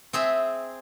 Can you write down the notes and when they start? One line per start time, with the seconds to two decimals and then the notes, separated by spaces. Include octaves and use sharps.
0.13 C4 G#4 E5